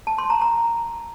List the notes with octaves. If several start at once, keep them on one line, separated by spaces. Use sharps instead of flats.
A5
C6
A#5
A#5